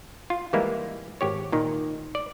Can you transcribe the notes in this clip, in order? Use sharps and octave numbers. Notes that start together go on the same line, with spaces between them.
F4
E3 G3 G#3 A#3 E4
G#1 G4 C#5
A#2 D#3
D5